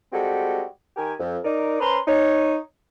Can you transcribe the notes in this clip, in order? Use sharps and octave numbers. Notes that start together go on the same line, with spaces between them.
G3 G#3 C4 F#4 G4 A4
D#3 G4 A#4 G#5
F2
D#4 A#4 D5
C#4 B4 C5 A#5 C6
D#4 C#5